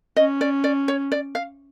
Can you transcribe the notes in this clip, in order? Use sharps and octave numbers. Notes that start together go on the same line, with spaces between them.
C#4 D#5
D5
D5
C#5
D5
F5